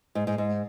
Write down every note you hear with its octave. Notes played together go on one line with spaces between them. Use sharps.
G#2
G#2
G#2